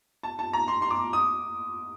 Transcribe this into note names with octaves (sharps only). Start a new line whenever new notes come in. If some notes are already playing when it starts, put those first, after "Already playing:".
A5
A5
A#5
C6
C6
D6
D#6